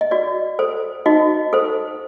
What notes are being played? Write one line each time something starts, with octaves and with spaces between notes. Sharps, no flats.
D#5
F#4 D5
A4 C5
D#4 F#4 D#5
A4 C5